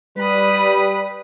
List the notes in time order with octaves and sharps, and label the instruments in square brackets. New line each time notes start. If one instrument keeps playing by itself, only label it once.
[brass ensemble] G3 B4 [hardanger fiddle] B5 D#6